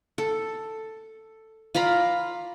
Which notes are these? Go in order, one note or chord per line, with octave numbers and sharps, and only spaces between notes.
A4
F4 D5 A#5 B5